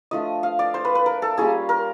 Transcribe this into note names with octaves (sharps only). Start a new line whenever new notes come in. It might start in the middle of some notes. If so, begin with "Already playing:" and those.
F3 A3 D4 F4 D#5
F5
D5
C5
B4
B4
A#4
A4
G3 A#3 C#4 F4 G#4
A#4